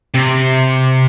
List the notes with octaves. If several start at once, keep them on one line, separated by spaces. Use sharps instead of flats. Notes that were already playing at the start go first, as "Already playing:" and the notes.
C3